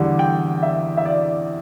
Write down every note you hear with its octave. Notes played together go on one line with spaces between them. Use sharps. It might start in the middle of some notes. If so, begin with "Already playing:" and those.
Already playing: E2 D3 G3
G5
E5
E5
D5